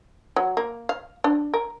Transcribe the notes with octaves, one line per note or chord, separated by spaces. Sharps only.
F#3
A#3
F5
D4
A#4